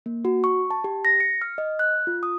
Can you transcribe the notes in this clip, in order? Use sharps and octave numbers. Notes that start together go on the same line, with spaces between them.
A#3
F#4
C#6
A5
G4
A#6
C#7
F6
D#5
F#6
F4
D#6